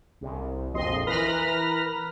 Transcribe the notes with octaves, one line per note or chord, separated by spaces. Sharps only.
C2
A#1 F2 D#5 C6
E3 A#4 B4 B5 F6 A#6